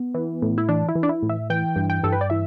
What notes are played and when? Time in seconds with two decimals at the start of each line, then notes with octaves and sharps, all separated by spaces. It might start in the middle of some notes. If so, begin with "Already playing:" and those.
Already playing: B3
0.14 E3
0.42 A2
0.58 E4
0.69 E3 D4
0.89 E4
0.95 E3
1.03 D4
1.09 E4
1.22 A2
1.29 E5
1.50 E3 G5
1.76 G2
1.90 G5
2.03 G2 A4
2.12 B4
2.21 D5
2.30 E3 E5